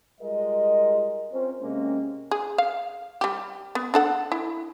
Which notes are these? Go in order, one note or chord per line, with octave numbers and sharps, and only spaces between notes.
G3 G#3 F4 G#4 A#4 D#5
C4 C#4 F4 A#4 C5
C3 G#3 A#3 C4 C#4
G#4
F5
G3 G4
B3
D4 A4 F#5
E4